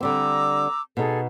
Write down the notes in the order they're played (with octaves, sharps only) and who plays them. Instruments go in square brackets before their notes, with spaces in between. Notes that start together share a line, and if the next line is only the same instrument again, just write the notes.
[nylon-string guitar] D3 G3 C4 [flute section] A#5 D6 E6
[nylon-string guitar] B2 D#4 [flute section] G#4 A4